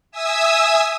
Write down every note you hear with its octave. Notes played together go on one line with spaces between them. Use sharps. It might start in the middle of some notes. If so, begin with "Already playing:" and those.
E5 G#5 D#6 E6